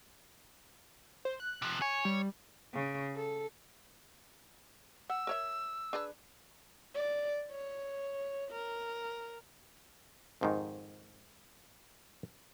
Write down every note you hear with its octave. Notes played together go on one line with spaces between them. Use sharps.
C5
F#6
C3 F3
C#5 G#5
G3
C#3
A4
F#5 E6
A#4 C#5 E5
D4 G#4 B4
D5
C#5
A#4
F2 G#2 D#3